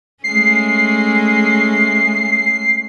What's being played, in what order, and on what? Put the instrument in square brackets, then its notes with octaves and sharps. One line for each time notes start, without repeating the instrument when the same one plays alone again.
[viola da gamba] G#3 A3 C#4 [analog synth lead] C7